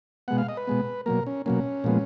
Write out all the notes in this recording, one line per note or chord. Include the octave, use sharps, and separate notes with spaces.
B2 G#3 B3 F#5
F5
D#5
B4
B2 G#3 B3
B2 F#3 A#3 A#4
C#4
B2 F#3 A#3 C#4
A#2 F3 G#3 B3